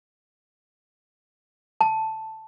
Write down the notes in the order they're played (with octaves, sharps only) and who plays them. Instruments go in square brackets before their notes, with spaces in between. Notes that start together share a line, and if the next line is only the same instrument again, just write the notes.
[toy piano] A5